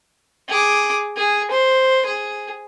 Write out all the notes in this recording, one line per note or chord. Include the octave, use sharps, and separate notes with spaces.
G#4 D6
G#4
C5
G#4